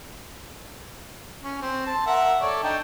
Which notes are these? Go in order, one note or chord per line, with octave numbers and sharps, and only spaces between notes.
C#4
C4
A5 C6
A#4 E5 F#5
A4 C#5 D5
D4 D#4 G5